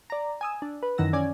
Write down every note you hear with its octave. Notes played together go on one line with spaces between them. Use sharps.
D5 A#5
G#5 D#6 E6
D4
B4
F#2 D#3 E3 F#5 E6 A#6
C#4 D5 G#5